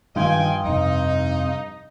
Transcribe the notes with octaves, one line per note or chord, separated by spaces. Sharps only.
G2 D#3 F3 D#5 F5 G5 G#5 C6
F2 C3 D#4